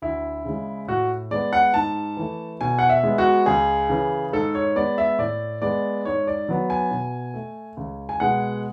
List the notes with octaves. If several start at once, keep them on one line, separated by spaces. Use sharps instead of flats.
D2 E4
C#3 G#3
A2 F#4
G#3 B3 D5
F#5
G#2 A5
E3 A3
B2 G#5
F#5
E5
G#3 B3
F#4
C#2 G#4
C#3 E3
G#2 A4
C#5
G#3 B3 D5
E5
A2 D5
G#3 B3 D5
G#2 C#5
D5
F#3 B3
G#5
B2
A3
C#2
G#5
B2 G#3 B3 F#5